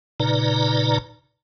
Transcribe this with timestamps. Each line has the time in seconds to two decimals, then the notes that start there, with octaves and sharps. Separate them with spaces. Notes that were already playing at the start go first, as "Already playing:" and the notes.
0.20 A#2 C#3 D#4 B4 D5 A#5